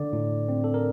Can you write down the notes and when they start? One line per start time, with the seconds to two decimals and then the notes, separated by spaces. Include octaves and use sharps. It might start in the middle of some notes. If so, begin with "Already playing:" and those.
Already playing: D3 D5
0.13 A2
0.48 C4
0.64 A4
0.74 A#4